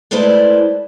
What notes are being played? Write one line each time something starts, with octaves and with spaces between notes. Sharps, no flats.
G#3 A3 E4 B4 C5 D5